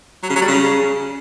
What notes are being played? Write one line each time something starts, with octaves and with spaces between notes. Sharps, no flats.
F#3
C#3
F#3
G3
C#3